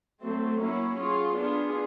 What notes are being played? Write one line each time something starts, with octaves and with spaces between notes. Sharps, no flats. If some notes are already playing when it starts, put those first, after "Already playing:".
F#3 A3 C4
F#3 A#3 C#4 E4
C#4 F4 G#4
B3 D4 F4 G#4